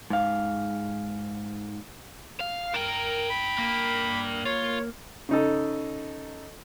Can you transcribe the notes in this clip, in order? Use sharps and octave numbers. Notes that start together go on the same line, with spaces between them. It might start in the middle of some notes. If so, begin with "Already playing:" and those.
G#2 F5
F5
D4 A#4 G5
B5
A#3
F4 C#5
C#3 D#4 A4